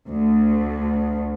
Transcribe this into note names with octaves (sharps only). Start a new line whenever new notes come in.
D2